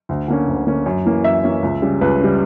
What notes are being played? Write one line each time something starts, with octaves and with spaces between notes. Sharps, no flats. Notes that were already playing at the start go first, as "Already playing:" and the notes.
D2
D3 A#3 C#4
D2
D3 A#3 C#4
F#2
E3 A#3 C#4
F#2 E5
E3 A#3 C#4
C#2
C#3 G3
C#2 B4
C#3 G3